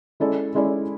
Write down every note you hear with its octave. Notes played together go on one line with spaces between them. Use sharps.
G#3 C#4 E4 A4 D5
G#3 C#4 E4 A4 D5